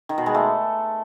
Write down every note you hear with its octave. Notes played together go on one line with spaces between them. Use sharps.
D#3
B2
G#3
A3